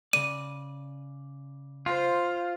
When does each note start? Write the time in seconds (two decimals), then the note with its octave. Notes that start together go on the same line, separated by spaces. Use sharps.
0.13 C#3 D5 D#7
1.86 F4 C5